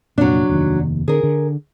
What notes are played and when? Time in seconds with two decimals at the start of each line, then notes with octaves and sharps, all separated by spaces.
0.18 F1 A#2 F#3 D4
0.49 F1 D#2 D#3
1.08 D3 G#4 A#4
1.23 D3